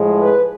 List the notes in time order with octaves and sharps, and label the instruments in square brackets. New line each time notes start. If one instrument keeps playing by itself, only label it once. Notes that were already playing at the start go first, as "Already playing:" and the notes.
Already playing: [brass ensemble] A2 F3 G#3
B4